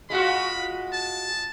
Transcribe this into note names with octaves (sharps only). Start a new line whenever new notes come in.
G#3 F4 F#4 B5
A5